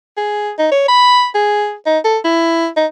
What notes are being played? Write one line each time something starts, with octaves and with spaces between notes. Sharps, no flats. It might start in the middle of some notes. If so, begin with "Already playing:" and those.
G#4
D#4
C#5
B5
G#4
D#4
A4
E4
D#4